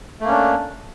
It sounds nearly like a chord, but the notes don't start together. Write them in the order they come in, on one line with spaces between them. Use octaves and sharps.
A3 A#3 C#4 D4